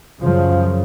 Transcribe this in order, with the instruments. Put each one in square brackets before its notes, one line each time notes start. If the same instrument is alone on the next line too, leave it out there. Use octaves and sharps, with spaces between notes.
[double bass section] F#2 C#3 F3